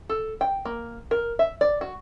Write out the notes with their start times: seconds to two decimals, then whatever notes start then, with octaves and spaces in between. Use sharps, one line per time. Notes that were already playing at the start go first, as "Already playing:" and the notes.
0.09 A4
0.41 G5
0.65 A#3
1.11 A#4
1.39 E5
1.61 D5
1.81 F#4